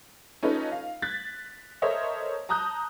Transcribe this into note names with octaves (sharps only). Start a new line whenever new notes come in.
C#4 D#4 F4 A4 B4
F5
F#6 G#6 A6 B6
A4 A#4 C5 C#5 D#5 E5
A5 A#5 D#6 F#6 G6